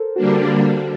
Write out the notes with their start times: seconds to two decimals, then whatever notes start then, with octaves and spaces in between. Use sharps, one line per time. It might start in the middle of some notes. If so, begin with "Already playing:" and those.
Already playing: A4 A#4 C5
0.16 D3 G3 A#3 D4 F#4